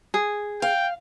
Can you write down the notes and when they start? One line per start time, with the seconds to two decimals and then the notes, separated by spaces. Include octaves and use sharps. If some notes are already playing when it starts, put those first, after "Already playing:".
0.14 G#4
0.62 F5 G5